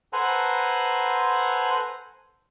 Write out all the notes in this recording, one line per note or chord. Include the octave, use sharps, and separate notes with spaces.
A4 B4 C5 F#5 G#5 A#5